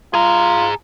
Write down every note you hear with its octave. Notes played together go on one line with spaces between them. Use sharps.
F4 G#4 A#5